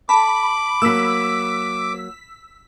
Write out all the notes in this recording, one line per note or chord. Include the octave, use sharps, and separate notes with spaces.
A4 A5 B5 D6
F#3 A#3 E6 B6